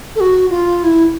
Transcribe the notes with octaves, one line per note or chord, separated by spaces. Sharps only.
A4
F#4
F4
E4